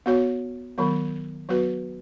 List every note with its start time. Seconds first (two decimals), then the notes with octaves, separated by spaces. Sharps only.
0.06 B3 F#4 C#5
0.78 D#3 F#3 B3
1.49 F#3 B3 F#4 B4